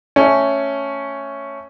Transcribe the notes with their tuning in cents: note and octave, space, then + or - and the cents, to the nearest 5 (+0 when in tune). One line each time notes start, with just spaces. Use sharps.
A3 +0 C#4 +0